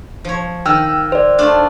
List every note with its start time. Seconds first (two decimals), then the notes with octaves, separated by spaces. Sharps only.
0.25 F3 C#5
0.66 D#3 G5 E6 F6
1.12 C5 D5
1.38 A3 D4 F4